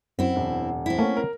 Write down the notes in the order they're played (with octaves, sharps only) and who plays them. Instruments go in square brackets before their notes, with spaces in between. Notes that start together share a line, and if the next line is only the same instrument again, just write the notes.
[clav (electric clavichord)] F#2 [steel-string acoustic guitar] C4 E4 [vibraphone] F#5
[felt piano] E1
[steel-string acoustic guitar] C4 E4
[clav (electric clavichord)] A3 A#3 [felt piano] C#4
[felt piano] A#4